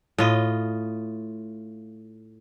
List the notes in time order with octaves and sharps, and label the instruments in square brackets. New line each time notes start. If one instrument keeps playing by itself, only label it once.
[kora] A2 F4 D#5